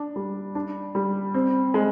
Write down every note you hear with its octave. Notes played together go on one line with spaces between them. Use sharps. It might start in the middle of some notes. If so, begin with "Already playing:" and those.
Already playing: D4
G3
D4
G3
C4
G#3